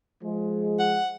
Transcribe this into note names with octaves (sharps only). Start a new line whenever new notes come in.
F3 G#3
F#5